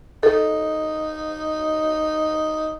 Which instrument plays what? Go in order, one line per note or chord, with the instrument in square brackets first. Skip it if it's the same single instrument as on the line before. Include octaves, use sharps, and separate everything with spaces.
[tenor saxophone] D#4 [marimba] A4